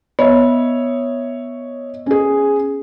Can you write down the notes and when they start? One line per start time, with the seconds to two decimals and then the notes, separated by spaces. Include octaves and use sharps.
0.19 B3 C#5 D#5 E5
2.06 C#4 G#4